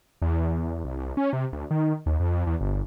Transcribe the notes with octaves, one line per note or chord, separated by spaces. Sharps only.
E2
C2
C#4
C3
D2
D#3
D#2
F2
E2
G1